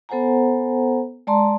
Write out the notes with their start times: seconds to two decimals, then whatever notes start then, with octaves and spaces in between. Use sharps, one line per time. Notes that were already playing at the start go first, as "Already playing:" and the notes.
0.09 B3 A4 C5 F#5 G#5 A#5
1.27 G#3 D5 A5 A#5 C6